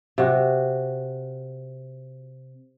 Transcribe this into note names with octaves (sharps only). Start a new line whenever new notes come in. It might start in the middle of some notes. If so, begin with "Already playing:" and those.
C3 F#4